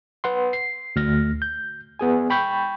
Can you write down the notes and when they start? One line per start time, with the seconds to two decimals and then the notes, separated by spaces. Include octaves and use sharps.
0.24 B4 F#5 C6
0.53 C7
0.96 D2 F6 A#6
1.42 G6
1.99 B3 G#4 G#5
2.30 G5 B5 C#6 G6